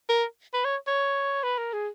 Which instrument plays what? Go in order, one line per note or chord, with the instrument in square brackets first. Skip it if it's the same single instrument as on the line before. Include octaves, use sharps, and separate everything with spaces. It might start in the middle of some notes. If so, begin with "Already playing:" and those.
[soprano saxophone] A#4
B4
C#5
C#5
B4
A#4
G#4